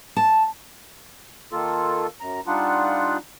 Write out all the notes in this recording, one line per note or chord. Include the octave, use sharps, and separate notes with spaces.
A5
D#3 A#3 F4 A4
F#2 A#5
G3 D4 D#4 F4 F#5